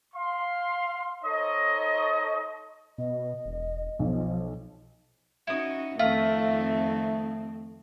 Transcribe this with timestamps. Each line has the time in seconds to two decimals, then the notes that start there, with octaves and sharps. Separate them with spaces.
0.14 F5 C6
1.23 D#4 A4 C5 C#5 D#5
2.98 B2 D#5
3.46 E1
3.99 B1 F3
5.47 C#4 D#4 E4 F#4 D#6
5.99 F2 D#3 A3 C4 F4 E5